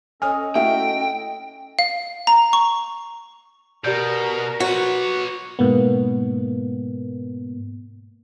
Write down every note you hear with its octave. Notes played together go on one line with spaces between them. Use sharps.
C#4 A4 C#5 D#5 G#5 D#6 F6
A3 E4 F#4 E5 G5
F5
A#5
C#6
B2 G4 A#4 D5 G6
F#4 B4 C#5
G#2 B2 A#3 B3